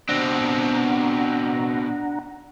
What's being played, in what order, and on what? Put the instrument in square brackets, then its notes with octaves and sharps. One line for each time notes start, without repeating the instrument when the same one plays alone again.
[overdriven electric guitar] B2 C4 [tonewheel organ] D4 F#5 A#5